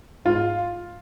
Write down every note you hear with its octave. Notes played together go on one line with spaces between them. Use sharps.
G#2 F4